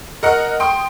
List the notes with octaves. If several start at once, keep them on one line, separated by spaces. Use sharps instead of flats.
A#4 D#5 F#5
G5 C6 D#6